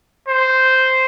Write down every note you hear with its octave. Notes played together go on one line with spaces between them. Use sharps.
C5